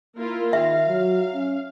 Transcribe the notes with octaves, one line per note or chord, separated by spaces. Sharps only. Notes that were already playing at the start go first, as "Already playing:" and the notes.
A#3 E4 F4 A#4
D#3 E5 F5
F#3
C#4